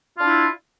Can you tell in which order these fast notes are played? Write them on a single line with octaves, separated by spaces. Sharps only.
F4 D4 E4